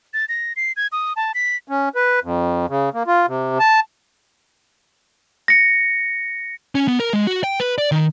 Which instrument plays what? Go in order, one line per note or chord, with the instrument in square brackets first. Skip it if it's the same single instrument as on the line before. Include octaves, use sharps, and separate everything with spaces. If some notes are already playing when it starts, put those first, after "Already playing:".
[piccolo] A6
A#6
C7
G#6
D#6
A5
B6
[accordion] C#4
B4
F2
C#3
A#3
F4
C3
A5
[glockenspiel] A#6 C#7
[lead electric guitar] C#4
B3
A#4
G#3
F#4
G5
B4
D5
D#3